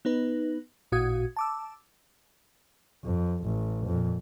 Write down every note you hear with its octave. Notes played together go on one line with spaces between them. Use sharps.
B3 D#4 B4
A1 A#2 F#4 D#6 G#6
A5 D6 E6
F2
A1
F2 A#2